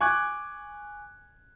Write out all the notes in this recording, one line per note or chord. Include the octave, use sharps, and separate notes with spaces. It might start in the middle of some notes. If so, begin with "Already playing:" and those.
G#5 C#6 D6 F#6 G#6